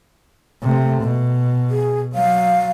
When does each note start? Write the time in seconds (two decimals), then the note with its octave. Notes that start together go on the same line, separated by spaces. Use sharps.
0.62 C3 A3
1.03 B2
1.70 G#4
2.15 F#3 F5